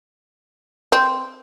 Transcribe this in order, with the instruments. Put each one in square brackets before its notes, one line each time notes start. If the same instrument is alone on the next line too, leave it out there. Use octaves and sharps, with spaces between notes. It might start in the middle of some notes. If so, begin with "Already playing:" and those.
[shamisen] C4